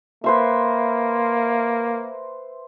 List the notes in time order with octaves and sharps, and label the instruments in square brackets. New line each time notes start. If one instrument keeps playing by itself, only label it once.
[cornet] A#3 [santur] B4 C5 E5